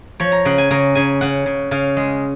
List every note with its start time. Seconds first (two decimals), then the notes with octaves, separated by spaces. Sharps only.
0.20 F3 C#5
0.32 A#5
0.45 C#3 F#5
0.58 G#5
0.71 C#3 A#5
0.95 C#3 G#5
1.21 C#3 F#5
1.46 C#3
1.71 C#3 F5
1.97 G#3